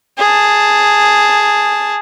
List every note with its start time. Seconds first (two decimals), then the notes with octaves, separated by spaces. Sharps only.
0.18 G#4 A5